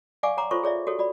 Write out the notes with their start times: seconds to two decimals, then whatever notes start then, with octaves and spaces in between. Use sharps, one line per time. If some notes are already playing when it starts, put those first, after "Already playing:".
0.23 D5 F5 F#5 G#5 C#6 D6
0.37 C#5 F#5 A#5 C6 D6
0.51 F4 A4 C5 C#5 C6 C#6
0.63 G#4 C#5 D5 E5
0.87 F#4 G4 A4 C#5
0.99 F#4 D5 B5